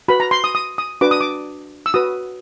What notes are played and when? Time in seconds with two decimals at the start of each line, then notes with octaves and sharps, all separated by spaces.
0.08 F#4 B4 B5
0.20 A#5
0.31 C6
0.44 D#6
0.55 D#6
0.78 D#6
1.01 D4 F#4 B4 D6
1.11 D#6
1.21 D6
1.86 E6
1.94 F#4 B4 D#6